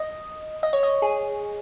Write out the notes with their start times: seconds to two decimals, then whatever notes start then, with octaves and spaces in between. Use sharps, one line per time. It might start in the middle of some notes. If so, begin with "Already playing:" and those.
Already playing: D#5
0.63 D#5
0.73 C#5
0.83 D#5
1.02 G#4